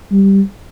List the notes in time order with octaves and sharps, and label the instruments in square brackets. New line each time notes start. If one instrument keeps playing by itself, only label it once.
[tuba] G3